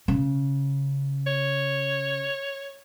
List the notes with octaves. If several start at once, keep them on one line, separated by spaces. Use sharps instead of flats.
C#3
C#5